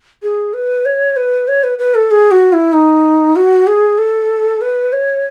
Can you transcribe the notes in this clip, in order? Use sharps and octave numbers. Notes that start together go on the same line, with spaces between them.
G#4
B4
C#5
B4
C#5
B4
B4
A4
G#4
F#4
E4
D#4
F#4
G#4
A4
B4
C#5